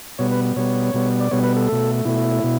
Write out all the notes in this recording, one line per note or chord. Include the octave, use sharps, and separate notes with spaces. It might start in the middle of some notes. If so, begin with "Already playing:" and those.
B2 G3 B3 C#5
B4
B2 G3 B3 C#5
B2 G3 B3
D5
B2 G3 B3 C#5
B4
A4
B2 A3
B2 A3 E4
B2